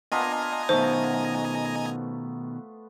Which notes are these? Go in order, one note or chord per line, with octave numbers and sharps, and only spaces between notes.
B3 D4 F4 D#5 G#5 A#5
B2 D#3 A3 C5